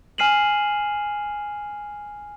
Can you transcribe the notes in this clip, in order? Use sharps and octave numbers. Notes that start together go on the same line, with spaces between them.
G#5 F6 C7 D#7 E7 F#7